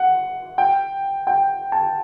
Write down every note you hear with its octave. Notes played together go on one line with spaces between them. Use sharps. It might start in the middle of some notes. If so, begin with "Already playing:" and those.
Already playing: F#5
G5
G5
A5